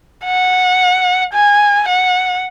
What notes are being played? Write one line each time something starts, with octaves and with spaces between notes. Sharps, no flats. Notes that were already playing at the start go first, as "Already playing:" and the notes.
F#5
G#5
F#5